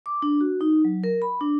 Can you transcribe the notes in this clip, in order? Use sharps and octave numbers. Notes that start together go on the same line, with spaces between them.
D6
D4
F#4
D#4
F#3
A#4
B5
D4